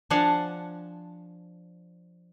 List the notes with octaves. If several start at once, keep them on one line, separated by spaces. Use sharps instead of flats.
F3 D4 F5 F#5 G#5 A5